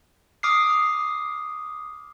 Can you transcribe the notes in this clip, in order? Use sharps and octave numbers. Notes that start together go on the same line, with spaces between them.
D6 D#6 F6 C7